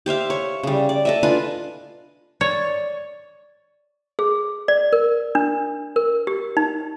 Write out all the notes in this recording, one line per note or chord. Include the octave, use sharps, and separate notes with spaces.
G4 C5 E5 F5
C#5
C#3 G3
D5
A4 D#5 E5
D4 F4 B4 G#5
C#5 D5
G#4
D5
A#4
D4
A#4
G4
D#4